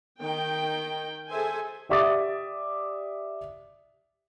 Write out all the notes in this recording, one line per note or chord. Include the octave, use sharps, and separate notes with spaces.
D#3 G5
G#4 A4 C5 E5 G#5
G4 D5 E5 D6 D#6 A6